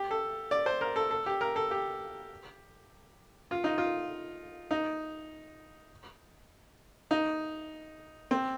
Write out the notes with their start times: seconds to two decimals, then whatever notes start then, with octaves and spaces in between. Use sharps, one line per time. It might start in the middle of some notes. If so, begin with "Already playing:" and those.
Already playing: G4
0.11 A4
0.51 D5
0.66 C5
0.81 A#4
0.96 A4
1.11 A4
1.26 G4
1.41 A#4
1.56 A4
1.71 G4
3.51 F4
3.64 D#4
3.78 F4
4.71 D#4
7.11 D#4
8.31 C4